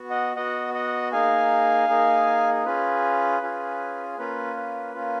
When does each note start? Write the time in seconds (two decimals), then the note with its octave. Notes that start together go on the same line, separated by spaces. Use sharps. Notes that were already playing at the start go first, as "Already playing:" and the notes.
Already playing: B3 F#4
0.10 D#5 F#5
0.36 B3 F#4 D#5 F#5
0.74 D#5 F#5
1.12 A#3 D#4 G#4 F5 G#5
1.89 A#3 D#4 G#4
2.65 C#4 F4 G#4 B4
3.42 C#4 F4 G#4
4.18 A#3 C#4 F4 B4
4.56 B4
4.95 A#3 C#4 F4